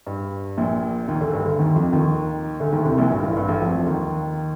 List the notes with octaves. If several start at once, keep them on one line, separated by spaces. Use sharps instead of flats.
G2
A#1 A#2
D#2 D#3
D2 D3
G2
D2 D3
D#2 D#3
F2 F3
D#2 D#3
D2 D3
D#2 D#3
C2 C3
A#1 A#2
G2
A1 A2
G2
A1 A2
F2 F3
D#2 D#3